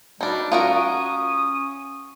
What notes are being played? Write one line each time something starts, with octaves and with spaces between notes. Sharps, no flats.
B2 G3 D4 D#4
C#4 F4 F#4 A#4 D#6